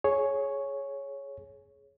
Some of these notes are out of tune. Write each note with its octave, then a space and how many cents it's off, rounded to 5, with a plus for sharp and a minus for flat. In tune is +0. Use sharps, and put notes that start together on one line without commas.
G#4 +15 C#5 +0